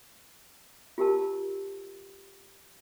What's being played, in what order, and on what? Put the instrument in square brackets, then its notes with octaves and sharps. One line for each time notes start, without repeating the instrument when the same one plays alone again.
[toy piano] F4 G4 A#4 A5